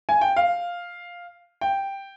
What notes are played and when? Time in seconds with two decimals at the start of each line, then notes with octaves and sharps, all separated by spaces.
0.09 G#5
0.21 G5
0.36 F5
1.61 G5